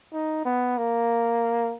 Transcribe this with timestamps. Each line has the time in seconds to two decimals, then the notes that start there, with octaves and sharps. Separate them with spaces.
0.13 D#4
0.45 B3
0.77 A#3